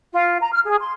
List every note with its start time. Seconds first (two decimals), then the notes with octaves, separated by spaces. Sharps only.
0.12 F4
0.40 A#5
0.52 F6
0.66 G#4
0.80 C6